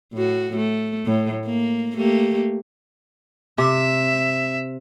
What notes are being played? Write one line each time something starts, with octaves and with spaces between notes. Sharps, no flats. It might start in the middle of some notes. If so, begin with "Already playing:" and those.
A2 F#4
A3
A2
A#3
A3 A#3 G4
C3 E5